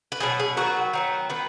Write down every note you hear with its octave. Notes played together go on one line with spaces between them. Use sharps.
B4
B2 F#3 B3 G#4
G#4
D#3 F#3 B3 F#4
D#3 F#3 B3
D#3 B3 B4